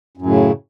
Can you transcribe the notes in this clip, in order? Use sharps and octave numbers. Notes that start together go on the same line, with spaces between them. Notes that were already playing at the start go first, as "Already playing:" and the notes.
F#2 A2 C#3